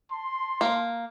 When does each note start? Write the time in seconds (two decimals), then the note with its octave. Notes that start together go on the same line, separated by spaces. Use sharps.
0.12 A5 C6
0.61 A#3